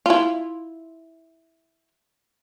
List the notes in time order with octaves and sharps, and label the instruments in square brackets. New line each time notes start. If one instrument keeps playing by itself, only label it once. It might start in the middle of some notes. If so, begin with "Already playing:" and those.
[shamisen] E4 F4